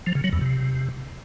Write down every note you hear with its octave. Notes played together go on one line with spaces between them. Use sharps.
F3
C#3
F#3
E2
C3